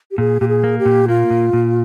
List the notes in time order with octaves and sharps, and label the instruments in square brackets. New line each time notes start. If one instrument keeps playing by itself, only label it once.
[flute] G4
[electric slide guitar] A#2 [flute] G#4
[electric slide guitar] A#2 [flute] G4
[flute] G#4
[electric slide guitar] A#3
[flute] G4
[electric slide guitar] A#2
[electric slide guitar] A#3 [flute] F4
[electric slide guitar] A#2
A#2